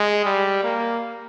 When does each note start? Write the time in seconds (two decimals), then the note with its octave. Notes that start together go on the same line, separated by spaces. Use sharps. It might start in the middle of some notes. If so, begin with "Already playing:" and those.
Already playing: G#3
0.25 G3
0.64 A#3